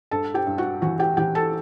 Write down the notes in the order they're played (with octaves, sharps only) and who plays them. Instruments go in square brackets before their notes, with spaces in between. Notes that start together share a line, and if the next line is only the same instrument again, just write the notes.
[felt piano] G2 A4 A5
G4 G5
G2
F#4 F#5
E3 F#4 F#5
G4 G5
E3 G4 G5
A4 A5